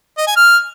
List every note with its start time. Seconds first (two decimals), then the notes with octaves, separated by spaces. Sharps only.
0.17 D#5
0.27 G#5
0.37 F6